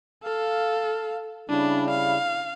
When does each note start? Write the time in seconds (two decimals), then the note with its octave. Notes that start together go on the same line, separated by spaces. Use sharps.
0.24 A4 F5
1.49 C#3 G3 D4 E4
1.90 F5